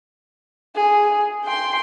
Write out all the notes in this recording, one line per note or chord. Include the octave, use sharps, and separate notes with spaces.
G#4
G5 C6